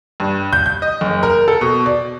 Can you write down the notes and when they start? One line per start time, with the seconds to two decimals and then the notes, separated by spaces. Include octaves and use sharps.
0.20 G2
0.53 G6
0.66 G6
0.82 D#5
1.01 F#1
1.23 A#4
1.48 A4
1.61 B2
1.86 D5